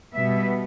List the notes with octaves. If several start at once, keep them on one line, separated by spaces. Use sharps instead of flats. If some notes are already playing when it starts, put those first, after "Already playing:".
B2 G3 B3 E5